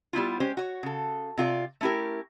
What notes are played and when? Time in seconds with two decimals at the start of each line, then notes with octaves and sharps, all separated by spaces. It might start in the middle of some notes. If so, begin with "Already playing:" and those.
0.13 G3 B3 E4 F4
0.40 G#3 C#4 G4 C5
0.57 F#4 C#5
0.83 C#3 A4
1.37 C3 F4 G4 D5
1.81 A3 C#4 E4 G4 A#4